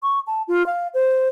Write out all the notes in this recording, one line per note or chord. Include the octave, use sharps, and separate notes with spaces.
C#6
A5
F4
F5
C5